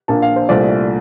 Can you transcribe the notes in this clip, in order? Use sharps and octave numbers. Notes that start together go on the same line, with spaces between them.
A#1 A#2 F3 A#3 D4 A5
F5
C5
C2 A#2 A3 C4 D5